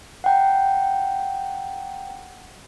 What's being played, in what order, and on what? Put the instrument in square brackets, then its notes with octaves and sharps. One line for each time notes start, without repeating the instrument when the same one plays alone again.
[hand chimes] F#5 G5 A#5